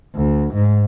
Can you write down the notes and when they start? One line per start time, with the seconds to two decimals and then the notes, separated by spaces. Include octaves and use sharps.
0.15 D2
0.54 G#2